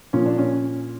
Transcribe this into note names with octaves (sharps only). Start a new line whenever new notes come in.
A#2 F3 C#4
D4
C#4